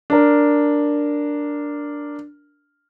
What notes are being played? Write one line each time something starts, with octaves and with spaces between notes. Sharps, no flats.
D4 A#4